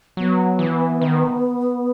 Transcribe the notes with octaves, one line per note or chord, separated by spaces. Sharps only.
F#3 B3
E3
D#3